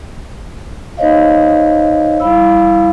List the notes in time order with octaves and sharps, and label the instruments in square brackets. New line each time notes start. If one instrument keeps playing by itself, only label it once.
[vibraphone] D#4 C5 C#5 D#5 F5
G3 E4 F5 B5 E6